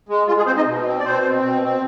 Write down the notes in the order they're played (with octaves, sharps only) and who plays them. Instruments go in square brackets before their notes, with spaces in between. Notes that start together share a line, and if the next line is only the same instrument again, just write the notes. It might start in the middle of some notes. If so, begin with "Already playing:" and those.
[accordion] G#3
G#3 F4
G#3 G#4
C4 C5
D#4 D#5
B2
C4
D5
B2 C4 C5
C4
B2
C4